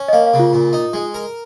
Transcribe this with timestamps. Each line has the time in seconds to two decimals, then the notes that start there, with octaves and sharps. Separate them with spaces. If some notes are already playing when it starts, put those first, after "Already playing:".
Already playing: C#4
0.08 D#5
0.13 A#3 F5
0.26 F5
0.33 C#3
0.39 F4
0.53 A#2
0.73 D#4
0.93 G#3
1.14 A#4